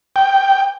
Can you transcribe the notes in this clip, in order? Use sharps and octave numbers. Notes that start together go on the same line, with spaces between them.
G5